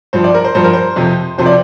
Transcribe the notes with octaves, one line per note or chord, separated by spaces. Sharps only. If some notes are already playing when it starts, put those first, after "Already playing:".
G2 F3 C5
D5
A#4
C5
G2 F3 C5
A#4
C5
F2 C3 F3
F2 C3 F3 C5
D5